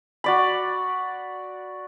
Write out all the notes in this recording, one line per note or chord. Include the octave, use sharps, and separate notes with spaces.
F#4 D5 B5